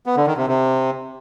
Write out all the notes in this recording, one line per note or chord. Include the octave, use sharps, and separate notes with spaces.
B3
D3
D#3
C3
C3